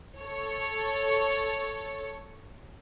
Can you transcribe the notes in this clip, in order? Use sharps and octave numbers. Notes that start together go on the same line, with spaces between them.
A4 C#5